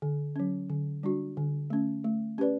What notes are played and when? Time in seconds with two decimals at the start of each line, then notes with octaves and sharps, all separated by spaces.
0.02 D3
0.36 F#3 C#4
0.70 D3
1.03 G3 D4 F#4
1.37 D3
1.70 A3 C#4
2.04 A3
2.38 C#4 G4 B4 D5